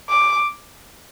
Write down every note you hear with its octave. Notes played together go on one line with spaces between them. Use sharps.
D6